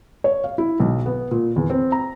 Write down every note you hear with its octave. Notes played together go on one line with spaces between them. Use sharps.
C#5
F5
E4
B1
B3
A#2
E2
C4
A#5